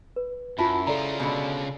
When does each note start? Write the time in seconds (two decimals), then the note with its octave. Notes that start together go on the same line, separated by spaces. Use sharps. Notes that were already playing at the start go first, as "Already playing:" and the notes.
0.16 B4
0.59 F#2 E4 F4 A5 B5
0.87 C#3 F4 A4 D5 A#5
1.20 B2 D3